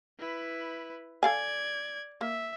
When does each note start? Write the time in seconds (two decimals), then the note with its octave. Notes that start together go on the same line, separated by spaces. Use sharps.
0.19 E4 B4
1.23 A4 D5 F5 G#5 G#6
2.21 A#3 E5